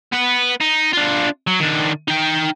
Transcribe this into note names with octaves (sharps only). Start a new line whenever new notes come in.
B3 B4
D#4
D4 F4
F#3
D#3 D4
D#4 G5